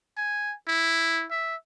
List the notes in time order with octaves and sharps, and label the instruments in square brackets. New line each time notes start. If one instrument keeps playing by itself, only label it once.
[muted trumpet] G#5
E4
E5